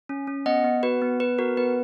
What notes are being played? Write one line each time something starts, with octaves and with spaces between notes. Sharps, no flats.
C#4
C#4
B3 D#5 F#5
B3
F#4 B4
B3
B3 B4
F#4 A#4
B3 B4